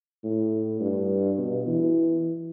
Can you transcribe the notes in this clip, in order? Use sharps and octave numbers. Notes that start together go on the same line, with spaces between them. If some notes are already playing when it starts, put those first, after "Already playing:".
A2
G2
B2
E3